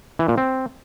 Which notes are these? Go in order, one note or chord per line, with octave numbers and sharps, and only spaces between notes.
E3
A#2
C4